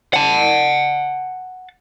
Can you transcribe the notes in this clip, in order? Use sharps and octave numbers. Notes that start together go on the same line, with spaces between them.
F#5 A5